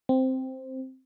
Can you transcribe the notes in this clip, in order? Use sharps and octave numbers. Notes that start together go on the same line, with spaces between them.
C4